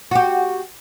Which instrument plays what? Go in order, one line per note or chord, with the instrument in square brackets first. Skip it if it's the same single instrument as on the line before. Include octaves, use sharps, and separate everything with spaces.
[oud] F#4 G4